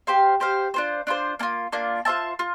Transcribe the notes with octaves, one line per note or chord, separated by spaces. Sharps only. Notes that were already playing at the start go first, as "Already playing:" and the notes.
G4 C5 F5
G4 C5 F5
D4 F4 C5
D4 F4 C5
A#3 D4 F4
A#3 D4 F4
F4 C5 E5 A5
F4